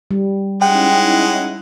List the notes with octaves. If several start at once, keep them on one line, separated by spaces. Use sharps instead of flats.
G3
G#3 C#4 D#4 E4 F#5 G5